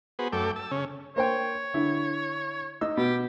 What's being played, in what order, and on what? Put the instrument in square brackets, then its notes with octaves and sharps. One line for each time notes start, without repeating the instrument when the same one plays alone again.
[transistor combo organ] B3 F#4 G#4 B4 C5
F#2 A3 A4 G5 D6
A5 E6
C#3 C#4
[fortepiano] A#3 C5 G5 [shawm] C#5
[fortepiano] D3 E4
D#4 E6
[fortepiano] B2 [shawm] G4